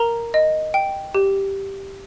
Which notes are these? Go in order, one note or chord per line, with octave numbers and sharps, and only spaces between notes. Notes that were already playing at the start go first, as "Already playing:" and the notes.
Already playing: A#4 A#5
D#5
G5
G4